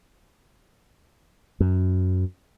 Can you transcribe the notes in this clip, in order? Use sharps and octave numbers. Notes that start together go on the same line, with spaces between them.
F#2